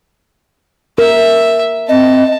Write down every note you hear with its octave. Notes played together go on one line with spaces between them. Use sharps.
A#4 E5
C4 D#5 A5